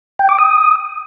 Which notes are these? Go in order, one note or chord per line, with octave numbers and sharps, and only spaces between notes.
G5
D6
D#6